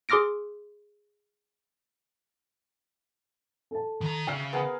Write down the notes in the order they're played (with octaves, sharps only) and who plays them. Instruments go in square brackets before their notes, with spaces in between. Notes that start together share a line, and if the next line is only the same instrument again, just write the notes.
[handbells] G#4 C6 D6 F6 A#6 D7
[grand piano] A4 A5
[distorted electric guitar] D#3 A#5
[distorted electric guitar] C#3 [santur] E5 F5 [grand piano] G5
[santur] B3 G#4 A#4